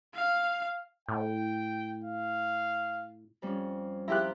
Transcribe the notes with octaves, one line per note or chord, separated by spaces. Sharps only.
F5
A2 G5
F5
F2 G3 C#4
F3 E4 G4 A#5 F#6